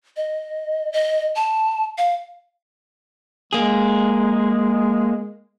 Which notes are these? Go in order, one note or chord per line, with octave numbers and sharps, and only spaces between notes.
D#5
D#5
A5
F5
G#3 A#3 G#4